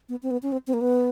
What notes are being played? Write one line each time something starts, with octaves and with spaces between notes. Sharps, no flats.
B3
C4
B3
C#4
C4
C4
A#3
B3